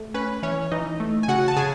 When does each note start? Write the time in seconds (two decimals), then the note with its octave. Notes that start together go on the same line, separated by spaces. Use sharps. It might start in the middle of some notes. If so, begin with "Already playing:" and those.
Already playing: A3
0.14 C#4 B4
0.43 E3 C#4 C#5
0.71 E3 D#4 D#5
1.00 A3
1.23 G#5
1.28 C#3 F#4 F#5
1.48 A5
1.56 C#3 G#4 G#5